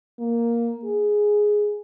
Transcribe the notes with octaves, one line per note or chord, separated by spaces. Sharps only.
A#3
G#4